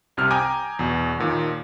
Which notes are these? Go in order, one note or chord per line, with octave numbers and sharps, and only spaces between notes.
C2 C3 F6
G5 G#5 A#5 D6 D#6
E2 B2
D#2 A#2 D#3